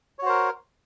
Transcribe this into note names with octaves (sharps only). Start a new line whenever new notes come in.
F#4 A#4 C5 C#5